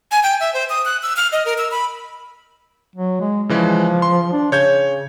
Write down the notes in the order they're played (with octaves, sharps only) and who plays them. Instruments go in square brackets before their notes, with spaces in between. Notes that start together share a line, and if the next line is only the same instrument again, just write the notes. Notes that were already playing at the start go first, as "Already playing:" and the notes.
[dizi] G#5
G5
E5
C5
D#6
F#6
E6
F6
D#5
A#4
E6
B5
[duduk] F#3
G#3
[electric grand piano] C#3 E3 G#3 [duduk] F3
[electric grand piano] C6
[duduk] D4
[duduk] C#3 [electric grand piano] C#5 G6 G#6